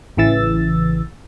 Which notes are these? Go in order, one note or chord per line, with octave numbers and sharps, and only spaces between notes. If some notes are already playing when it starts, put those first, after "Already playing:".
A1 C#3 E3 E6 A6